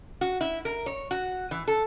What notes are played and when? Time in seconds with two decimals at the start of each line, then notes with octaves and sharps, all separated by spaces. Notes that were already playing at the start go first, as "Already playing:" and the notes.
0.21 F#4
0.41 E4
0.65 A#4
0.86 C#5
1.11 F#4
1.51 E3
1.68 A4